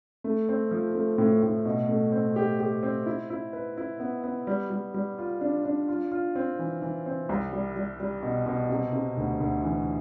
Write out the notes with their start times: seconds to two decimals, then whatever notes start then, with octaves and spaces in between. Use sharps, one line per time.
0.24 A3
0.49 C4
0.71 F3
0.95 A3
1.18 A2
1.42 A2
1.65 B2
1.89 A3
2.12 C4
2.36 G4
2.60 G4
2.83 C4
3.06 E4
3.30 E4
3.53 B4
3.77 E4
4.00 B3
4.24 B3
4.47 G3
4.70 G3
4.94 G3
5.18 F4
5.41 D4
5.65 D4
5.88 F4
6.11 F4
6.36 C4
6.59 E3
6.82 E3
7.06 C4
7.29 C2
7.53 G3
7.76 G3
8.00 G3
8.23 B2
8.46 B2
8.69 C3
8.93 C3
9.17 D2
9.40 D2
9.64 E3